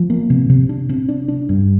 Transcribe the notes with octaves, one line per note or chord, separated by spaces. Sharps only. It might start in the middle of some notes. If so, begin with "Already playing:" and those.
Already playing: F3
A#3
C3
C3
D4
C3
D4
D4
G2